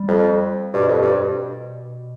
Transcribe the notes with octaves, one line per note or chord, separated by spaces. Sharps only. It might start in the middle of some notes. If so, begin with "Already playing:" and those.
Already playing: G3
F2
G2 B2
F2
G2